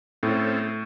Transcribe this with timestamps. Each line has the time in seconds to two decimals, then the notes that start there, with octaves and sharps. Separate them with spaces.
0.23 A2 C4 C#4 A4